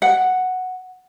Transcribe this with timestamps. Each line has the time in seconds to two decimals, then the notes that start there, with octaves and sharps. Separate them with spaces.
0.02 F#5